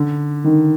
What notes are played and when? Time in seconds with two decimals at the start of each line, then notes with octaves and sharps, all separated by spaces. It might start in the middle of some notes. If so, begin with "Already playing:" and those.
Already playing: D3
0.44 D#3